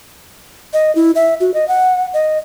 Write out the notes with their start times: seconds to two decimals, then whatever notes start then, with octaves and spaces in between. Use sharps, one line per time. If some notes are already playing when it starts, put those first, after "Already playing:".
0.73 D#5
0.95 E4
1.15 E5
1.40 F#4
1.54 D#5
1.68 F#5
2.14 D#5